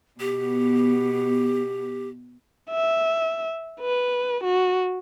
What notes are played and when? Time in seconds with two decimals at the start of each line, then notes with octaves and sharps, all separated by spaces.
0.20 B2 B3 G4
2.70 E5
3.80 B4
4.44 F#4